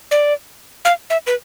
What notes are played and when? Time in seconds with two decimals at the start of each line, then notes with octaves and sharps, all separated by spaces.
0.11 D5
0.85 F5
1.10 E5
1.27 B4